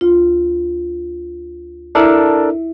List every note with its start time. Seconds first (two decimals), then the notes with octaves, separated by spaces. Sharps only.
0.01 D2 F4
1.95 D4 E4 A4 A#4 E5